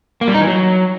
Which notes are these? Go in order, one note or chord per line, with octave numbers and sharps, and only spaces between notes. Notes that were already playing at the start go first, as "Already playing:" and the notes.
A#3
G3
D#4
E3
F#3